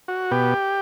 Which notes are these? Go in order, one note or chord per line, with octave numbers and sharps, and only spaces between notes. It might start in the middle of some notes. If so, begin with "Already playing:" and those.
F#4
B2 G4